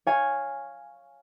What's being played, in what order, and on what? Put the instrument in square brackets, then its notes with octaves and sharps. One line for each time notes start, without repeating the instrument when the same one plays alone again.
[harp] C#5 F5 G#5